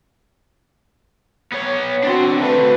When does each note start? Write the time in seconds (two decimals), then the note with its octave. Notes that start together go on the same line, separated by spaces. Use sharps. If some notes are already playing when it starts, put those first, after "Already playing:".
1.52 B3 C#5
2.03 C4 D4 F#4 C6
2.40 D3 A3 B4